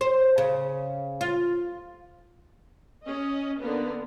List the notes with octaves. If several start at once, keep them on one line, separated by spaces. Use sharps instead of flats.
C5
C#3
F4
C#4 D#5
D3 A#3 B3 A#4